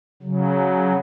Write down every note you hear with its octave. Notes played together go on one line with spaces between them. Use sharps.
C#3 F#3